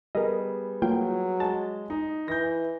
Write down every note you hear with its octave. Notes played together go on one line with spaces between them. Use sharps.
G3 B3 G#4 A#4 D#5
F#3 A#3 F4 G5
G#3 A5
D#4
E3 G6 A#6